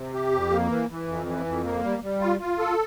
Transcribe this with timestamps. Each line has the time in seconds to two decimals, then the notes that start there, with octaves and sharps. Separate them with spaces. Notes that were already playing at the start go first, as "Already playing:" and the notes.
Already playing: C3
0.14 G4
0.32 F2
0.51 A#3
0.69 E3
0.89 E3
1.07 F2
1.26 E3
1.46 F2
1.64 A#3
1.83 G3
2.02 G3
2.21 F4
2.40 F4
2.59 A4